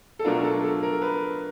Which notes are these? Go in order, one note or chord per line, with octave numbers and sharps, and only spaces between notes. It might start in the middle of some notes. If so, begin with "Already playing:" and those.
A4
B2 F#3 A3 D4 F4 A#4
A4
A4
A#4
B4